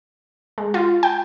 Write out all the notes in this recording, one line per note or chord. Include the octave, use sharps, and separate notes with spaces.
G#3
F4
G5